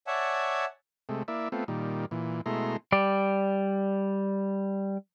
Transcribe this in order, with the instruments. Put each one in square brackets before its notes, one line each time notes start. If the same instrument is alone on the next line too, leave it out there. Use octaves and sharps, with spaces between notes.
[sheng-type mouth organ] C#5 D5 E5 F#5 G#5 A5
[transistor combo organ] C3 G#3 A3
A#3 E4 D5 E5
A3 B3 C4 F4
A#2 D#3 G3
A#2 E3
B2 G#3 A3 E4 A#5 C6
[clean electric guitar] G3 D5